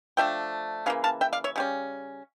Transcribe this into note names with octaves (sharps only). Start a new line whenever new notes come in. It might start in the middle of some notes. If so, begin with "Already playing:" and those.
F3 A3 D4 E5 G5
C#3 E3 A#3 F5
F5 A5
E5 G5
D5 F5
C#5 E5
C#3 G3 C#4